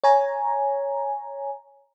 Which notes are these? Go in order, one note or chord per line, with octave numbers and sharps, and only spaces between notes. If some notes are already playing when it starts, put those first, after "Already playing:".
C#5 G#5 A#5